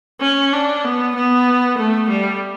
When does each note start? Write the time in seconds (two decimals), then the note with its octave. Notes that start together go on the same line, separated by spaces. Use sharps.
0.21 C#4
0.53 D4
0.84 B3
1.15 B3
1.78 A3
2.09 G3